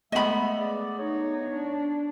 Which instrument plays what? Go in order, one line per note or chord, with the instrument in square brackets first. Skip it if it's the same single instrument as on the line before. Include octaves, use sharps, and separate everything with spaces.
[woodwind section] G#3 E5 [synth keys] A3 B3 [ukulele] D#5 B5
[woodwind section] G#4 D5
[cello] D#4 [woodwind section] C#5
[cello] D4